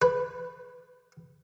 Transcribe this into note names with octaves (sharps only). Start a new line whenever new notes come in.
B4